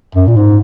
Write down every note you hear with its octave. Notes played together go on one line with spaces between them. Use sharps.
F#2
A#2
G#2